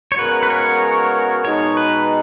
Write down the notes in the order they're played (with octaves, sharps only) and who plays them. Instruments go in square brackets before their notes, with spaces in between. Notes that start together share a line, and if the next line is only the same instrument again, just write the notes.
[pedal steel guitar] C#5
[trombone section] C#3 G#3 B3 F#4 A#4 [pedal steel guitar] B4
[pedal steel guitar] B4
C#5
[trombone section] B2 G#3 D#4 [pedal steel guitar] C#5
[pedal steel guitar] B4